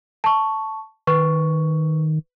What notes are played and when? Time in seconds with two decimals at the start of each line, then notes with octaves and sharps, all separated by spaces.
0.24 A5 C#6
1.07 D#3 B4 C#6